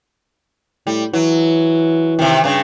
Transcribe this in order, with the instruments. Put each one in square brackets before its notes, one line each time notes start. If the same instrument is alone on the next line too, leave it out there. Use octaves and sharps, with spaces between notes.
[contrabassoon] A2 [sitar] G3
[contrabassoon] E3 [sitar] F#3
[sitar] C3 D#3
G2 C#3